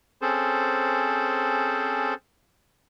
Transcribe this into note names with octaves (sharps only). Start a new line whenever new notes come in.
C4 C#4 G#4 A4 C5